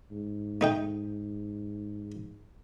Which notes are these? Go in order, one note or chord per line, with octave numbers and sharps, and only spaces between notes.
G#2
A3 D#4 G5